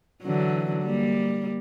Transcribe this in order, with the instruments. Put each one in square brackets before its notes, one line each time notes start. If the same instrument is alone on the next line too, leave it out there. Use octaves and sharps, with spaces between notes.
[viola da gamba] D3 E3 F#3
G3 A#3